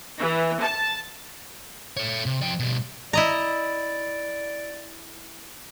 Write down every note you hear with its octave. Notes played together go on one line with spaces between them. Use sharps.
E3
A5
A4 C#5
C3
F3 G5
B2 G3
E4 D5 D#5 A#5